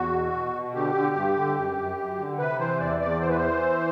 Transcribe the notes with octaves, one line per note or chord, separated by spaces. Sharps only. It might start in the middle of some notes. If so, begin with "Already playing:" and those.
Already playing: E2 F#4
B2
B2
B2
D3 G4
D3
G2
D3
F#2
F#2
F#2
D3
C3 B4
E3 C5
E2 D5
E2 D5
E3 C5
B4
E3 C5